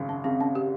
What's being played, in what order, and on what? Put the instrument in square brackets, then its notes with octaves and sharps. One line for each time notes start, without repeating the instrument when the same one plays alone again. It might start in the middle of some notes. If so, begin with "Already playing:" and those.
Already playing: [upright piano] G#1 F#2 C#3
[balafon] C#4
[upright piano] C#3 [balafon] C4
[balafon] C#4
G4